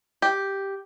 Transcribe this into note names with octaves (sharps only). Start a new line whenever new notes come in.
G4